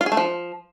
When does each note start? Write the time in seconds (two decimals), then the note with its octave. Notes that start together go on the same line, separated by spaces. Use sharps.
0.01 F4
0.06 G#4
0.12 A3
0.17 F3